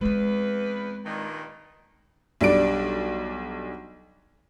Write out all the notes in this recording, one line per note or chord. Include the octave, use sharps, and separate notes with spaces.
E2 G#3 C4 B4
G2 A#2 D#3
B1 G3 D4 D5 D7